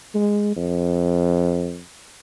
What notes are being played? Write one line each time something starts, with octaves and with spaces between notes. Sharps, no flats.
G#3
F2